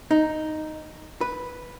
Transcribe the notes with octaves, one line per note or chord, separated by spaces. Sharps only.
D#4
B4